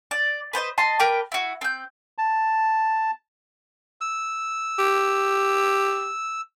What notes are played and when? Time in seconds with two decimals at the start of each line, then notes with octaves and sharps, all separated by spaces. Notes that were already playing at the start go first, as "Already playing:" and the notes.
0.11 D5
0.53 B4 C5 D5 D#5
0.78 D#5 A5 C6
0.99 A#4 B4 G5 D6
1.32 E4 F#4
1.61 C4 G6
2.18 A5
4.01 E6
4.79 G4